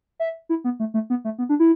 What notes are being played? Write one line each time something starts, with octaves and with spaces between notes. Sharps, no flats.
E5
E4
B3
A3
A3
B3
A3
B3
D4
E4